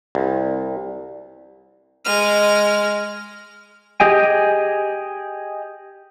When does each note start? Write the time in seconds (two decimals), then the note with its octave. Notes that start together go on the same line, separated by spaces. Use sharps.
0.15 C2
2.05 G#3 F6
4.00 G4 G#4 D#5 G5 G#5